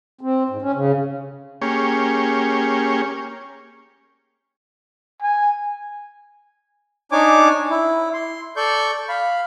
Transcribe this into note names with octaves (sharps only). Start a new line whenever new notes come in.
C4
G#2
C#4
C#3
A#3 C#4 G4 G#4 C#5
G#5
D4 D#4 C#5 G#5 D6
E4
C6
A4 D5 C#6 G6
F5 B5